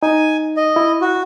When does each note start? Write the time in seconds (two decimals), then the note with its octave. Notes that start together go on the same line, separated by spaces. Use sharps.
0.03 D#4 G#5
0.57 D#5
0.76 E4
1.01 F#4